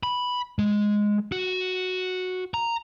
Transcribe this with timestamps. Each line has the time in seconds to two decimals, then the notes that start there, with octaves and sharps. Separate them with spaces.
0.03 B5
0.59 G#3
1.32 F#4
2.54 A#5